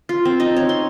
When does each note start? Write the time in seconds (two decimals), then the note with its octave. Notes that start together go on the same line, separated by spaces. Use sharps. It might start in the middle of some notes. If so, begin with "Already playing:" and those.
0.09 F4
0.25 C4
0.40 D#4
0.56 C#5
0.69 C6